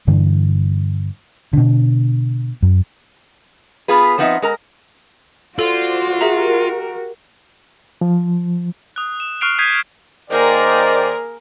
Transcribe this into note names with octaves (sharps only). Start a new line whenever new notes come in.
G2 D3 E3
B2 D3
F#2
B3 F4 G#4 B4
F3 B3 C4 D#4 E5
G#3 A#4 A#5
F4 F#4 A4 C5 D5
G4 G#4 A#4 E5 A#5
F3
D#6 F#6
E7
C#6 F6 F#6 C7 D7 F7
D#6 G6 G#6 B6 C7 D#7
D#3 A#3 G#4 A#4 C5 D5 D#5 G5